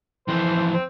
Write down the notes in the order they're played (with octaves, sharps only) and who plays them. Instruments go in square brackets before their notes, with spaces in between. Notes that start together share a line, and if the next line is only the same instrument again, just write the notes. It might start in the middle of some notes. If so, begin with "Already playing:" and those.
[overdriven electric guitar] F2 E3 [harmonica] C5
[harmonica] C4